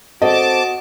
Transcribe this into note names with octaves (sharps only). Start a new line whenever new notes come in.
C4 F#4 A4 D#5 A5 D6